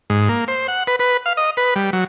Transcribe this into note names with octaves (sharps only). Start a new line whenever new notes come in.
G#2
A#3
C5
F#5
B4
B4
F5
D#5
B4
G3
F#3